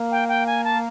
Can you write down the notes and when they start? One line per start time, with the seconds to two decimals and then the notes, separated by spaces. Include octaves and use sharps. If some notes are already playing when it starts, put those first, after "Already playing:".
Already playing: A#3
0.11 G5
0.28 G5
0.46 G#5
0.64 A5